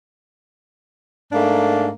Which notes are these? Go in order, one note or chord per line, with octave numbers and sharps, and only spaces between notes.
G#2 A3 A#3 D4